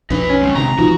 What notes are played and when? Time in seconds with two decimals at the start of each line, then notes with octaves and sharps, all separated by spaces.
0.10 B1 F2 D4 D#4 B4
0.29 C#4
0.42 G#3 C4
0.55 E1 C3 D4 A#5
0.79 A1 E3 F3 D#4 F4 F#4